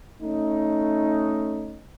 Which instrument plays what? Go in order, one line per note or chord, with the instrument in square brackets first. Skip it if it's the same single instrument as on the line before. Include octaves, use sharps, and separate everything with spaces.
[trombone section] A3 C#4 D#4